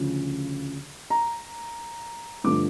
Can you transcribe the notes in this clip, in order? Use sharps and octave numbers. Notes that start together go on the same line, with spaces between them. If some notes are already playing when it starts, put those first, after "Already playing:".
Already playing: D2 C#3 F3
A#5
G2 D3 F3 A3 D6